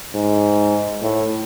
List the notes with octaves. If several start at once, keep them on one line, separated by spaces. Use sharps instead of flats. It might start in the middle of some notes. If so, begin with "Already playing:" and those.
G#2
A2